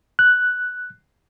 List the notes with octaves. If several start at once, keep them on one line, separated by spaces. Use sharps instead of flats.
F#6